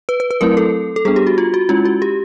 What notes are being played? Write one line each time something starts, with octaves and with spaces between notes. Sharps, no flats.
B4
B4
B4
F#3 A3 C4 E4 A#4
A4
A4
G3 B3 D4 G#4
G4
F#4
F4
F#4
G#3 C#4 E4 F4
F#4
G4